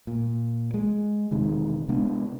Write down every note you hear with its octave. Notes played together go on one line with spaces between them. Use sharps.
A#2
G#3
E1 C3 D#3 G#3
C3 G#3 B3 D4